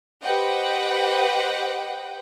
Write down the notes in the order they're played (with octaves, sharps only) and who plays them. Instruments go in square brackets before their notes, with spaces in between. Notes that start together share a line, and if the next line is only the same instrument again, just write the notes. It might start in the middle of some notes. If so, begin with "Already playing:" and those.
[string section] G4 B4 C5 D#5 F#5 G5